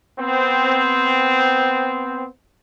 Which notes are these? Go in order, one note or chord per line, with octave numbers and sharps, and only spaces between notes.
B3 C4